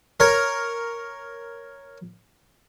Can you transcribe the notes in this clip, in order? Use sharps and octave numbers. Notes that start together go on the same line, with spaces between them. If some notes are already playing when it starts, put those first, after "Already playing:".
A#4 C#5 A#5